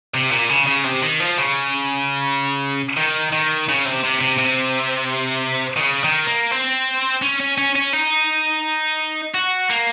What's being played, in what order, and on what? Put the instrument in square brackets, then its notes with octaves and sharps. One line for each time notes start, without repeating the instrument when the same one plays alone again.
[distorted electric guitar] C3
A#2
C#3
C#3
C3
D#3
F3
C#3
D#3
D#3
C#3
C3
C3
C3
C3
D#3
C#3
D#3
A#3
C4
C#4
C#4
C#4
C#4
D#4
F#4
A#3